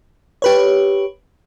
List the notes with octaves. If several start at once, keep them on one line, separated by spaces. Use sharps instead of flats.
G4 B4 C#5